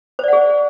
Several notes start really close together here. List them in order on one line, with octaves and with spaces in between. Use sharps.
C5 D5 F#5 G#4